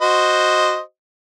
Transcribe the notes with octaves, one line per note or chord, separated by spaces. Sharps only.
F#4 C5 D#5